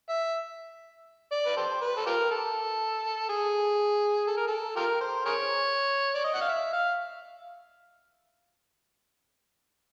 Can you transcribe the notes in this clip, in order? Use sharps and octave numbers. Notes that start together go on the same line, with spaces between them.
E5
D5
B4
G4 A4 C5
B4
A4
F4 G4 A#4
A4
G#4
A4
A#4
A4
F4 G4 A#4
C5
G#4 A#4 C#5
D5
D#5
F#5
F5
E5
F5